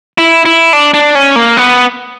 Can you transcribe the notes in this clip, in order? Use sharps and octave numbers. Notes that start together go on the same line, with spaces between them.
E4
E4
D4
D4
C#4
A#3
B3